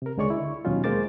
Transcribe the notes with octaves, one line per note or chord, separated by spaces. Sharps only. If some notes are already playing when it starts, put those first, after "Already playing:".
C3 A#4
C#2 D3 G#3 C#5 D5 C#6
E4
D#2 B2 F#3 C#4 D#4 F4
G#3 A#3 A#4 C5 D6 A6